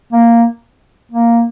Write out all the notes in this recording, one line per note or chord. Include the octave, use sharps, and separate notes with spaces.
A#3
A#3